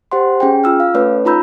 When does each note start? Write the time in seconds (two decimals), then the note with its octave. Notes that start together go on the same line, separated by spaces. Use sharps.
0.12 G4 C5 F#5 C6
0.40 C#4 G#4 G5
0.64 F4 E6 F6
0.80 F5
0.94 A3 C#4 A4 B4 C#5
1.25 D#4 F4 A#5 B5 E6 G6